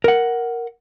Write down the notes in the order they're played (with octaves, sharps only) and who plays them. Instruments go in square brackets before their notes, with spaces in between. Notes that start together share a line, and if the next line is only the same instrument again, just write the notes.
[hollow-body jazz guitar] A#4 F#5